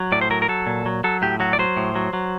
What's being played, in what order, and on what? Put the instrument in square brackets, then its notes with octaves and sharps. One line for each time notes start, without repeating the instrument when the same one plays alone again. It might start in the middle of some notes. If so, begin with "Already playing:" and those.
Already playing: [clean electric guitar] F#3
A2 D5
C5
F#3 A#4
A#4
F#3 A4
A#2
F#3
F#3 A4
A2 G4
F#3 F#4
D5
F#3 C5
A2
F#3
F#3